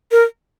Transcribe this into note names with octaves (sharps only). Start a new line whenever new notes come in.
A#4